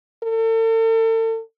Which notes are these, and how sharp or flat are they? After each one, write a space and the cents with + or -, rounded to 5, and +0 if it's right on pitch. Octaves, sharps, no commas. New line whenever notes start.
A4 +40